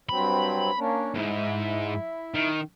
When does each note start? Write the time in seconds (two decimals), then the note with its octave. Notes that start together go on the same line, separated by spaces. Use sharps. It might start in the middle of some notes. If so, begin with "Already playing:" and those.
0.09 G2 F#3 C4 B5
0.78 A#3 C#4 D4
1.15 C#2 G#2 E4
2.34 D#3